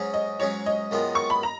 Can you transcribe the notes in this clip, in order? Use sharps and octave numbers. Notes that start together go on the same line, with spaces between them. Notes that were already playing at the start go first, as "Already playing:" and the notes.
Already playing: G#2 F#3 C#4 G#4
D#5
G#2 F#3 C#4 G#4 C#5
D#5
F#2 D#3 G#3 B3 F4
C#6
B5
A#5